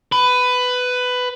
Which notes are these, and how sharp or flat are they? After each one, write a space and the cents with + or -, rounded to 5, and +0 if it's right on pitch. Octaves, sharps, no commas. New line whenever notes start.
B4 +15